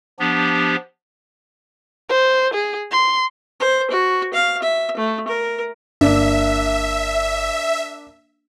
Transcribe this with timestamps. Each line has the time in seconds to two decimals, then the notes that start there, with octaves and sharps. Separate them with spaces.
0.19 F3 B3 D4 G4
2.09 C5
2.54 G#4
2.91 C6
3.60 C5
3.90 F#4
4.33 F5
4.62 E5
4.97 A3
5.28 A#4
6.01 G1 A#3 D4 E5